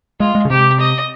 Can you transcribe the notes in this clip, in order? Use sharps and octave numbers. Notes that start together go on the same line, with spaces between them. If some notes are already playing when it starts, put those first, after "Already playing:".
G#3 F4
G#3
C#3
C3 G4
D#5